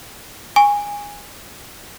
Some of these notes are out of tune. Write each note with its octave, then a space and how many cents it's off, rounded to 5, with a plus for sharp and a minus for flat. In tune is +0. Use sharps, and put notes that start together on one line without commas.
G#5 -15 C#6 +0